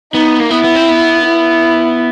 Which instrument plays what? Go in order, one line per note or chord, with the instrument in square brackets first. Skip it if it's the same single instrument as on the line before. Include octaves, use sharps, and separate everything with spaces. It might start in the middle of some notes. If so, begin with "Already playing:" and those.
[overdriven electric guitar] B3 [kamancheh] D#4
[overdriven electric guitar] A#3
[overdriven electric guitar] B3 [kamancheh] E4
[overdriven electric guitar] B3
C4
B3
[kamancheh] E4